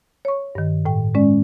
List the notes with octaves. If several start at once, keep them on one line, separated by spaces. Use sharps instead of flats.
C#5 C#6
G2 D#3
A2 G5
G#3 C#4 D5